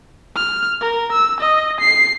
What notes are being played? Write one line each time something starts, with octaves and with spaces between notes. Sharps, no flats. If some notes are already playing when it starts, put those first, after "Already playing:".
F6
A#4
E6
D#5
C7